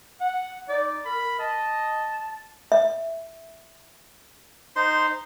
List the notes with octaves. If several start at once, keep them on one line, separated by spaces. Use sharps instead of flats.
F#5
D#4 D5
A#4 B5
D#5 A5
E5
D#4 C5 C6